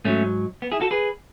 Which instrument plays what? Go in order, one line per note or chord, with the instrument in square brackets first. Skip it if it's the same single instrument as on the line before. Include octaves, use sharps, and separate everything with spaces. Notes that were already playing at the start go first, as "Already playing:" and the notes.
[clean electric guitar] G#2 F#3 A3 C#4
B3
E4 G#4
F#4 A4
G#4 B4